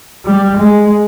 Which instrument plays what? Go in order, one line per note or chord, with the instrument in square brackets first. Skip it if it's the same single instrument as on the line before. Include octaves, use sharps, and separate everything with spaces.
[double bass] G3
G#3